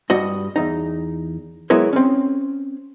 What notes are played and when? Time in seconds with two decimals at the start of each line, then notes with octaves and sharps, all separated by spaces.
0.10 G2 G3 F#4 D#5
0.56 E2 D#4
1.70 F#3 G#3 B3 E4 A#4 C#5
1.93 C4 C#4